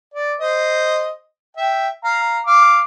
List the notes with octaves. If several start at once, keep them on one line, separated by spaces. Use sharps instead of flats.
D5
C5 D#5
E5 G5
F5 A#5
F5 D6